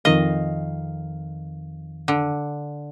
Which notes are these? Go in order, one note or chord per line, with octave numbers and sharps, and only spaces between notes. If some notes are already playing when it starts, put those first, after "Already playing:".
F2 D#3 D#5 F5
D3